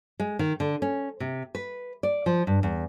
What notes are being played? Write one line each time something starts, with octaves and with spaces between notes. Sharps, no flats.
G#3
D#3
D3
C#4
C3
B4
D5
F3
G2
E2